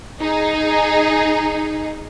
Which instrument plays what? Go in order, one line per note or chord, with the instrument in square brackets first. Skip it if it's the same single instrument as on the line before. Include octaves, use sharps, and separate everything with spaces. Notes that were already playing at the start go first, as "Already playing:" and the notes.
[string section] D#4 G#4